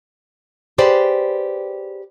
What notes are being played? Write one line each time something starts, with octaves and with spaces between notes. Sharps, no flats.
G4 G#4 B4 C5 D5 G5